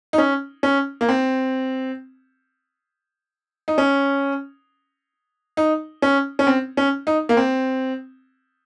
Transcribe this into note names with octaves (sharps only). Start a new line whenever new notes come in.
D#4
C#4
C#4
A#3
C4
D#4
C#4
D#4
C#4
C#4
C4
C#4
D#4
A#3
C4